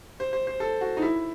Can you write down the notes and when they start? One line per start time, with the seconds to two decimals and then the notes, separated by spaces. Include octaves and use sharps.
0.20 C5
0.33 C5
0.47 C5
0.60 A4
0.81 F#4
0.97 D#4
1.02 E4